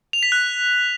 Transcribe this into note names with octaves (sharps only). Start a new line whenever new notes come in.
F7
B6
F#6